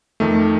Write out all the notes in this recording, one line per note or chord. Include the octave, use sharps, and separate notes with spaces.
F2 D#3 A3